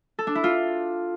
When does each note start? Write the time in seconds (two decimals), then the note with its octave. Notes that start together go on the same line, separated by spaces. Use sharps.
0.19 A4
0.27 D4
0.35 E4
0.44 F4